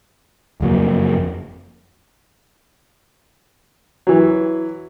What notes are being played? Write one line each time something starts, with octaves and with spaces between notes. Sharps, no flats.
F#1 F2 F#3 A#3
E3 F#3